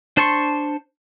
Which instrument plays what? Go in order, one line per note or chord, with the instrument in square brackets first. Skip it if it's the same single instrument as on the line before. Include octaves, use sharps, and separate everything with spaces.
[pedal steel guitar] D4 C5 A5 C6 C#6